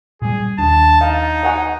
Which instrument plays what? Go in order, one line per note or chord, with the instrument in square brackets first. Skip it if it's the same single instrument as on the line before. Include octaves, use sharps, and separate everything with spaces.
[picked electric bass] A#2 G3 [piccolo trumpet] G#4
[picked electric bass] D#2 D4 [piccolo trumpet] A5
[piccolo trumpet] D#4 [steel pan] F5
[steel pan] D#5 F#5 G#5